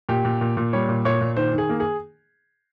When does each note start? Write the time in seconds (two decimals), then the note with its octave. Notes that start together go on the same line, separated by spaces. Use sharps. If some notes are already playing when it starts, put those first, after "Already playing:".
0.09 A#2 G4
0.25 A#2
0.41 A#2
0.57 A#2
0.73 G3 C#5
0.89 A#2
1.05 A#2 C#5
1.21 A#2
1.37 D#3 C5
1.53 D#3
1.58 G#4
1.69 A#3
1.80 G#4